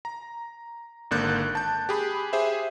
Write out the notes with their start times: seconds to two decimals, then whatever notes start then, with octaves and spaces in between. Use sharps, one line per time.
0.05 A#5
1.11 G#1 D3 A#3 F#6 G6 A6
1.55 A5 G6
1.89 G4 G#4 B5
2.33 G4 G#4 C5 E5